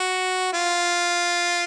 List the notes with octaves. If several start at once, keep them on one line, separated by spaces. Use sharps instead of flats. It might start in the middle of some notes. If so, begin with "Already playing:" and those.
Already playing: F#4
F4